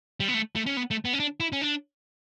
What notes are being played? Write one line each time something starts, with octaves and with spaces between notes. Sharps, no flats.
G3
B3
A3
A3
C#4
B3
A3
B3
C#4
D4
E4
C#4
D4